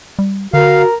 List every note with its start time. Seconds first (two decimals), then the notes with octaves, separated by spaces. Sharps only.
0.19 G3
0.54 D3 F#4 A#4 F5